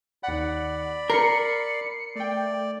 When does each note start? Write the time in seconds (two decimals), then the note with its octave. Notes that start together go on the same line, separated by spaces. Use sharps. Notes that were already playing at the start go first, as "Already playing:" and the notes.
0.23 D#2 D5 F#5 B5
1.10 A#4 C7 C#7
2.15 A3 D5 G5